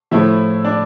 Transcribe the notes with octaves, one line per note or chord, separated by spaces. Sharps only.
A2 F3 A3 E4 E5
D4 D5